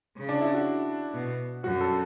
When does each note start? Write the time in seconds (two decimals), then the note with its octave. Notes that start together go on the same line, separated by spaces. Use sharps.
0.17 C#3
0.29 D4
0.41 E4
0.54 F#4
1.15 B2
1.64 F#2 F#4
1.81 A4